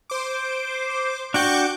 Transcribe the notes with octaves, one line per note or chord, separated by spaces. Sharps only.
C5 D6
D4 F#4 G5 C#6 D6 G6